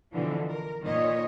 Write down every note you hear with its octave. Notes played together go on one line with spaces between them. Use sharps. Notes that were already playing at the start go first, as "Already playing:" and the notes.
B2 D3 E3 F3
A#4
A#2 D#3 C#5 D#5